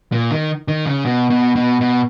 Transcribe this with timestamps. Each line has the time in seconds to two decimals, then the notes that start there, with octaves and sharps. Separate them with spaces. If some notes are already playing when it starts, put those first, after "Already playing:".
0.12 A#2
0.31 D#3
0.68 D#3
0.87 C#3
1.05 B2
1.30 B2
1.56 B2
1.81 B2